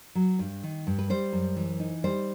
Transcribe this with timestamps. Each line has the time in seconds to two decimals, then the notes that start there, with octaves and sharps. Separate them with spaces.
0.15 F#3
0.39 G2
0.63 D#3
0.87 G2
0.98 B4
1.10 G3 C5
1.33 F#2
1.56 E3
1.80 D#4
2.04 G3 C5